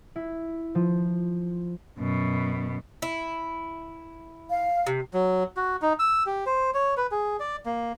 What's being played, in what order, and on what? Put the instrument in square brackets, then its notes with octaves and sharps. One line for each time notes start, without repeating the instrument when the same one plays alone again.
[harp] E4
F3
[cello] F#2 B2
[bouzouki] E4
[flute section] F5
[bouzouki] C3
[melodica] F#3
F#4
D#4
E6
G4
C5
C#5
B4
G#4
D5
A#3